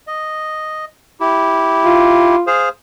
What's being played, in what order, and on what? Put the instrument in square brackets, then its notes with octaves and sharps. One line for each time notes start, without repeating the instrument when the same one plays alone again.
[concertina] D#5
E4 G4
[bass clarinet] F4
[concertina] G#4 C5 F5